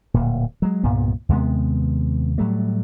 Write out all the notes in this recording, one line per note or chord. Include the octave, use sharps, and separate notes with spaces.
D1 A#2
F#3 G#3
C2 G2 A#2 B3
D#2 C3 G#3 B3
A2 F#3 G3 A3